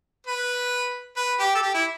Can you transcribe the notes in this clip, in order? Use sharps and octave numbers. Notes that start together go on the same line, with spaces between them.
B4
B4
G4
A4
G4
E4